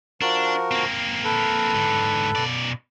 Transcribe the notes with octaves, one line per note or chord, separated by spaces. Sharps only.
F3 D4 F#4 A#4
A#3 C4
A4 B4
G#2 D3
B2 D5